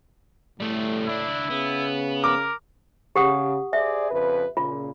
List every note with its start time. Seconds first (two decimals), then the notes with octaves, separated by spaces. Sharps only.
0.60 A2 G3 A3
1.06 C#2 D4 E4
1.50 C#3 B3
2.24 A#4 D6
3.16 C#3 G4 F#5 D#6
3.73 G#4 C5 D5 E5
4.11 F2 C#3 B4
4.57 A#2 C#3 F4